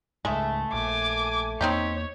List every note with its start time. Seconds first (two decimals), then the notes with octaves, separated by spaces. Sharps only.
0.25 C#2 G#2 G#3 A3 E5
0.73 A#1 G#5 D6
1.61 E2 A#3 C4 D#4 G4 C#5